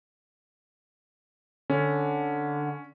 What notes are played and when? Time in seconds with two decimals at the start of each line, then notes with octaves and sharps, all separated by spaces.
1.70 D3 C#4